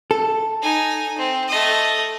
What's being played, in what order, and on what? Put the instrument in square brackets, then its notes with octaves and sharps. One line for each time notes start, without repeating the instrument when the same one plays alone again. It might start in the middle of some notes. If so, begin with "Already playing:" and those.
[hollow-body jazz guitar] A4
[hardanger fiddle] D#4 G#5
C4
A3 D#5